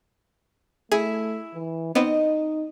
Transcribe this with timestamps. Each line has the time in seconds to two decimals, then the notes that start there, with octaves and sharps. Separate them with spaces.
0.92 A3 E4 G#4
1.54 E3
1.95 B3 C4 D#4 D#5